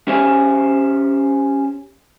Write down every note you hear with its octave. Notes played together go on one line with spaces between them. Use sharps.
C#4 G4 C5 C#5 G#5